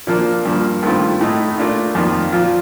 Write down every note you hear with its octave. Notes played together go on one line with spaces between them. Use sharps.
A#2 F3 A#3 D4
G2 F3 A#3
G2 D#3 A3 C4 F4
A2 A3 D#4
A#2 A3 D4 F4
F2 D#3 A#3 F4
A#2 F3 A#3 F4